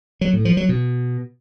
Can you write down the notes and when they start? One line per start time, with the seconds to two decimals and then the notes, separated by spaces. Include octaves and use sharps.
0.21 F#3
0.33 A2
0.45 F3
0.57 F#3
0.69 B2